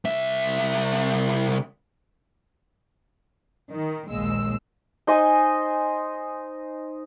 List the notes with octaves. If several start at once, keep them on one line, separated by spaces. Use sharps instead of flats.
C2 E5
D#3
A#1 D#2 G#3 E6
D#4 C5 D#5 G#5